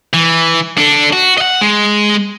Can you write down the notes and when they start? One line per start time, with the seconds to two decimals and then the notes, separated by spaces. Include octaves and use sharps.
0.13 E3
0.78 D4 A4
1.13 F#4
1.38 D#5 F#5
1.61 G#3